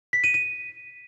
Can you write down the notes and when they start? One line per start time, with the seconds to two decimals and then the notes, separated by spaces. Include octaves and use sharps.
0.13 B6
0.24 D#7
0.34 D#7